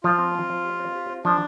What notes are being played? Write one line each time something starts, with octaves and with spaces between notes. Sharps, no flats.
F3 F4
C4
C4
F3
G4
C4
G4
C4
F3 D4